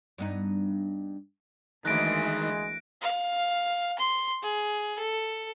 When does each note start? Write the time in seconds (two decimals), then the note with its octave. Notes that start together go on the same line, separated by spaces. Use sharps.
0.18 G2 B3 D#4
1.85 D2 D#3 E3 G#3 A#3 F#6 A#6 D7
3.01 F5
3.98 C6
4.42 G#4
4.98 A4